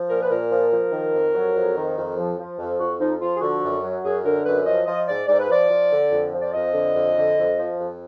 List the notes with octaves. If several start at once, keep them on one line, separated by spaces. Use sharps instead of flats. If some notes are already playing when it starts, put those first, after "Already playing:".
Already playing: F3
A#2 A#4
B4
A#2 A#4
F3
F3
D#3
F2
F#3
F2
D#3
F2
F3
F3
F2
F2 F#4
F3 D#4
F3 F4
G#4
D3 F#4
F#2
F#3
F#2 G#4
D3 A#4
F#2 B4
F3 D#5
F3 D#5
G#2 D5
G#2 D5
B4
F3 D5
F3
D3
F2
F3
D5
F2 D#5
D3
F2
D3
F2
F3
F2